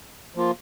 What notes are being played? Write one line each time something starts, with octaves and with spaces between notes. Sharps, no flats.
F3 A#3 F4